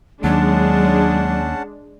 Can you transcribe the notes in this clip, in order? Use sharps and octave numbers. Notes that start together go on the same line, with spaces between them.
D#2 F#3 G#3 C#4 D4 F#5 A5